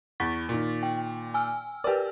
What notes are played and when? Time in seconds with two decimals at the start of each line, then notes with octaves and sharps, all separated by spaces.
0.20 E2 C#6 A6 B6
0.49 A#2 D#3
0.83 G5
1.34 G#5 E6 F6
1.84 G4 A#4 B4 D5